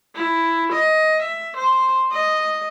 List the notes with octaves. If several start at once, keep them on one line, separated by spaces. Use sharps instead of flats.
E4
D#5
E5
C5
D#5